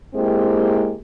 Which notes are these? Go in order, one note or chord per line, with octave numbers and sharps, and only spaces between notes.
G#3 A#3 C4 E4 G4